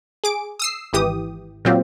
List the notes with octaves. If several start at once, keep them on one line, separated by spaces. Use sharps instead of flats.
G#4 D6 D7
D#6 E6 C7
G#1 E3 G4 D#6
A#2 F#3 C4 F4 G4